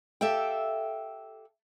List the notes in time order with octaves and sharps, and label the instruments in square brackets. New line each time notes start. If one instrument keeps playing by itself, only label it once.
[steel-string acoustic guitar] G4 A4 E5 F5 G5